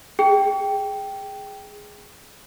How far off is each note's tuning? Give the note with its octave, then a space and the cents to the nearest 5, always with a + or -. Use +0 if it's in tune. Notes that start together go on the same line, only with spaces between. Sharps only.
G#4 +0 G5 +0